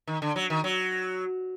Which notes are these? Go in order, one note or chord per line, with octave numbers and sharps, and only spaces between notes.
D#3
D3
F#3
D#3
F#3